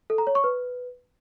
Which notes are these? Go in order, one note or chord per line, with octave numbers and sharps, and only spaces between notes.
A4
A#5
C#5
C#6
B4